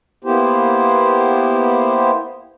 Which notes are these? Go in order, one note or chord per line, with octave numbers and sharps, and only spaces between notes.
A#3 B3 E4 G4 C5